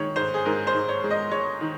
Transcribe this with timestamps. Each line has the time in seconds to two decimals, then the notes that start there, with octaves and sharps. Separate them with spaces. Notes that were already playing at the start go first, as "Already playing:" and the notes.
Already playing: D#3 G#3 C#5
0.16 G#2 C5
0.34 G#4
0.45 G#2 A#4
0.67 C5
0.74 G#2
0.89 C#5
1.04 G#3
1.11 D#5
1.31 G#3 C#5
1.61 D#3